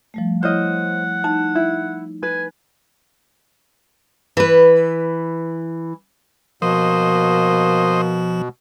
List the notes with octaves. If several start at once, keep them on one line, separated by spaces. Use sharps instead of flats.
F3 G3 A3
E4 C5 C#5 D#5 F#5 F6
D#4 A5
E4
B4 G#5
E3 B4
B2 F3 A#3 C5 D#5